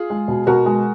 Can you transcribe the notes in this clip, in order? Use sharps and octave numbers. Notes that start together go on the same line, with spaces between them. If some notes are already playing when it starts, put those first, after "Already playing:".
Already playing: F4 G#4
G#3
B2
B2 F#4 A#4
G#3